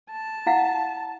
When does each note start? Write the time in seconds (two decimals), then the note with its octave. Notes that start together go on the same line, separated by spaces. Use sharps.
0.11 A5
0.46 E4 F5 F#5